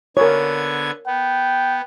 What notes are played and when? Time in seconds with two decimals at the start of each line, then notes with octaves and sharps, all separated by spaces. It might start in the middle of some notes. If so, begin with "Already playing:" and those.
0.17 D3 B3 A#4 C#5 G#6
1.07 B3 G5